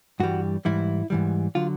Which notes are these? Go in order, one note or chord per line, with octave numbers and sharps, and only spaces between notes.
G2 E3 G3 F#4
G#2 E3 G3 E4
G#2 E3 G3
D3 F#3 F4